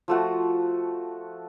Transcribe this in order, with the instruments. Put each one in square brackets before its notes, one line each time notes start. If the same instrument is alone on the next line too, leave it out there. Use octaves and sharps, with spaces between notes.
[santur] F3 A3 F#4